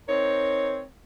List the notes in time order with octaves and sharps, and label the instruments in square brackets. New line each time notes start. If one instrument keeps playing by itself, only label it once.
[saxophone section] C4 D#4 A#4 C#5